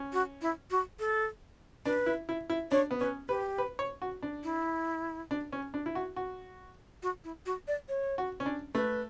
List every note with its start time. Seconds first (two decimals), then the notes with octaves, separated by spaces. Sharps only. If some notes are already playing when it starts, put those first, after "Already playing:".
Already playing: C#4
0.13 F#4
0.42 E4
0.71 F#4
0.99 A4
1.85 D4 B4
2.06 E4
2.29 E4
2.50 E4
2.71 D4 C#5
2.91 B3
3.00 C#4 B4
3.29 G4 B4
3.58 B4
3.79 C#5
4.02 F#4
4.22 D4
4.44 E4
5.31 D4
5.52 C#4
5.74 D4
5.86 E4
5.95 F#4
6.16 F#4
7.03 F#4
7.24 E4
7.46 F#4
7.68 D5
7.89 C#5
8.18 F#4
8.40 C#4
8.46 D4
8.75 A3 B4